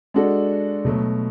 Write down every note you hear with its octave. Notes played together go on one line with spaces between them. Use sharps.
G#3 D4 F#4 A4
B2 F#3 A3